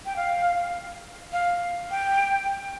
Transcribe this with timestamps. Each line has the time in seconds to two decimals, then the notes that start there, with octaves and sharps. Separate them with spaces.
0.06 G5
0.16 F5
1.32 F5
1.91 G5